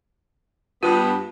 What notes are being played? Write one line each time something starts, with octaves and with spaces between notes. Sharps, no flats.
G2 B3 F4